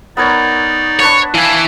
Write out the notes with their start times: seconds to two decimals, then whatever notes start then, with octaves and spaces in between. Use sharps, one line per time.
0.17 B3 D#4 A#4 C#5 D5
0.99 D4 B4 C#5 C#6
1.34 E3 E4 F5 A5